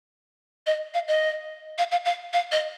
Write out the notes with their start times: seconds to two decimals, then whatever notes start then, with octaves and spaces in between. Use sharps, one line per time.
0.67 D#5
0.94 F5
1.08 D#5
1.78 F5
1.92 F5
2.05 F5
2.33 F5
2.52 D#5